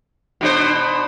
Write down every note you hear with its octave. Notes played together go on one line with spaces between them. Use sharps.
B2 D4 C5